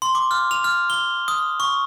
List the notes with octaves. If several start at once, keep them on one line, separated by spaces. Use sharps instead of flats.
C6
D6
F6
F7
F6
G7
D#6
C#6